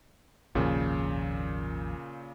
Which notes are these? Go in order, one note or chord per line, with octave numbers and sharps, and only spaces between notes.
G#1 D#2 A#2 C#3 F3